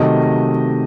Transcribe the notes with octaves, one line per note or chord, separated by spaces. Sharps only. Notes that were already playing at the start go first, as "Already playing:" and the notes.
Already playing: C3 D#3 F#3 A3 D#5